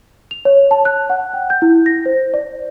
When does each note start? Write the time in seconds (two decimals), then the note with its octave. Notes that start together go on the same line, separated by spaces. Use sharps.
0.31 F7
0.45 C#5
0.71 A5
0.85 F#6
1.10 F#5
1.34 G5
1.50 G6
1.62 E4
1.86 A#6
2.06 C5
2.34 D5